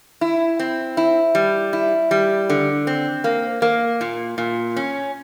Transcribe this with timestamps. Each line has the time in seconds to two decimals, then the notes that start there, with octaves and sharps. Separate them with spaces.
0.21 E4
0.59 C4
0.97 E4
1.35 G3
1.73 E4
2.11 G3
2.50 D3
2.87 C4
3.24 A#3
3.62 A#3
4.01 A#2
4.38 A#2
4.76 C#4